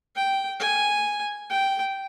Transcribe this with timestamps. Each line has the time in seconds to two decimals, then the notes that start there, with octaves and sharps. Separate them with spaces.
0.16 G5
0.60 G#5
1.50 G5